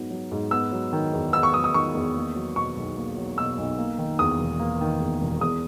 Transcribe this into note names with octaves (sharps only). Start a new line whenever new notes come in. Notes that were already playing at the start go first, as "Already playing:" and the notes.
Already playing: G#2 F#3 B3 D#4
F#3
G#2
B3 E6
F#3
D#3
E2
B3 E6
C#6
F#3 D#6
D#6
D#3 C#6
E2
A#3
F#3
B2 C#6
B1
A#3
F#3
B2 E6
B1
A#3
D#3
E2 D#6
E1
A#3
D#3
E2
E1
E2 D#6